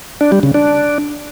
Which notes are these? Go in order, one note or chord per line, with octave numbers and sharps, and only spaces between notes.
D4
G3
C#3
D4